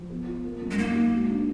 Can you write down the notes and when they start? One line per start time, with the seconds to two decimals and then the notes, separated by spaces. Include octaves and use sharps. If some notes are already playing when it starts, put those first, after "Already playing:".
Already playing: F3
0.10 B3
0.26 F4
0.44 A#3
0.62 F#2
0.71 G#3
0.78 A#3 D#4
0.95 F#4
1.13 G#3
1.30 D4